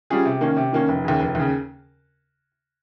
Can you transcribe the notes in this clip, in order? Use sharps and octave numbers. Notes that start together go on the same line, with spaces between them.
G3 C#4 F4 G#4
C3
D#3 A#3 C#4
C3
D#3 A#3 C#4
F1
D#2 C#3
F1
D#2 C#3